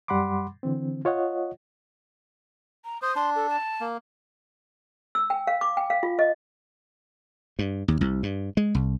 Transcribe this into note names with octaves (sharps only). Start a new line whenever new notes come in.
F#2 G3 F#5 B5 C6 D6
D3 E3 C4
F4 C#5 D#5 F#5
A#5
C5 D#6
D4 C6
A4
A5
A#3
E6
G5
F5
D6
G5
F5
F4
D#5
G2
D#2
C2
G2
G#3
C2